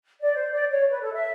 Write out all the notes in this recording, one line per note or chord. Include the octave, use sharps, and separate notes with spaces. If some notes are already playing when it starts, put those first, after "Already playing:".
D5
C5
D5
C#5
B4
A4
E5